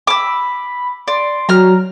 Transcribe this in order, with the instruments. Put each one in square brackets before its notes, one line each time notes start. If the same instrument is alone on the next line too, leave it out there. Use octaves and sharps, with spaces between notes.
[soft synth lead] B5 [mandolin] D6 E6
[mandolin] D5 [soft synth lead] C6
[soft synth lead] F#3 [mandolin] A#5 F6